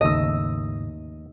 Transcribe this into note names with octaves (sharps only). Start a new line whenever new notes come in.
G#1 D#2 C#3 A3 D#5 E6